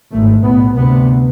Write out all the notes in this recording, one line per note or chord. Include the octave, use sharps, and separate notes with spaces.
G#1 G#2 A3
B1 A2 B3
D2 C3 B3